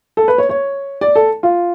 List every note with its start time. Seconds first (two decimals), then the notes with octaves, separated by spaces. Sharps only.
0.17 A4
0.28 B4
0.38 C#5
0.49 C#5
1.01 D5
1.15 A4
1.43 F4